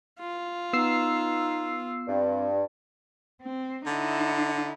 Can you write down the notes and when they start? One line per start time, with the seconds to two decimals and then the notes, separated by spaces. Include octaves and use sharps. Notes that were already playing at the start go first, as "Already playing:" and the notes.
0.19 F4
0.73 B3 D#4 E6 C7
2.08 G2 C4
3.42 C4
3.86 D3 D#4 E4